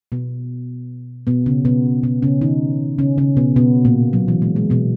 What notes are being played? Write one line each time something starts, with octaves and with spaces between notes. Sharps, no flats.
B2 B3
B2 B3
C#3 C#4
B2 B3
B2 B3
C#3 C#4
D#3 D#4
C#3 C#4
C#3 C#4
B2 B3
B2 B3
A#2 A#3
F#3
E3
G#3
G#3
B2 B3